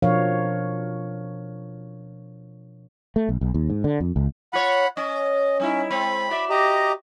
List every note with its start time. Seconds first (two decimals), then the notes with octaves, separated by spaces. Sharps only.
0.02 B2 F3 D4 A#4 C#5 F5
3.16 A3
3.29 B1
3.41 B1
3.54 D#2
3.70 G#2
3.84 D3
4.00 F2
4.16 C#2
4.53 F4 C#5 F#5 B5
4.97 C#4 D#5
5.60 G3 C#4 D#4 E4
5.90 G#3 C4 B5
6.30 F#4 D5 E5
6.50 G4 D#5 A#5